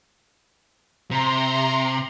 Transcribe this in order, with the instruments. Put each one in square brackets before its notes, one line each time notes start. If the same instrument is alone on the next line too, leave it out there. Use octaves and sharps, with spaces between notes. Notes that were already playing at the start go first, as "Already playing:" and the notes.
[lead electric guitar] C3 [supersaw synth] A#5 C6